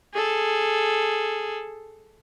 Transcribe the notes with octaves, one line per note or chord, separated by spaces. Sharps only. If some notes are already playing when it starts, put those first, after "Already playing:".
G#4 A4